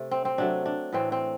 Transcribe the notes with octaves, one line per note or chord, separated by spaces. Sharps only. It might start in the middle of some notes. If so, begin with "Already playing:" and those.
Already playing: C3 A3
C4
C4
C3 F#3 A3 D4
D4
A2 E3 A3 C4
C4